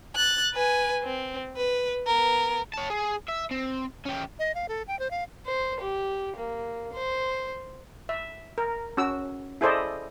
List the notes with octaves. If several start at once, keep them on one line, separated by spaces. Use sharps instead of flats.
F#6 A6
B4 G#5
C4
B4
B3 A#4
C#5 A5
G#4
E5
C4
C#4 G4
D#5
F5
A4
G5
C5
F5
C5
G4
A#3
C5
E5
A#4
C#4 F#4 E6
E4 G#4 A4 C5 D5 D#5